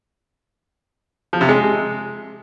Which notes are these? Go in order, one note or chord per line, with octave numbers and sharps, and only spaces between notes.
F3
C3
G#3